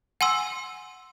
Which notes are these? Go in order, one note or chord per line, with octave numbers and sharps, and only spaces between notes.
F#5 G#5 C6 E6